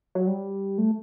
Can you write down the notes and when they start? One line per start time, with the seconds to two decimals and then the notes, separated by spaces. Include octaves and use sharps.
0.15 F#3
0.27 G3
0.78 A3